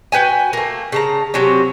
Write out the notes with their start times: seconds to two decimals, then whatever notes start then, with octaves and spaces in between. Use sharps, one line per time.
0.12 F#4 B4 G5 G#5
0.53 A3 A#3
0.92 C#3 A5 A#5
1.34 C3 F#3 C4 C#4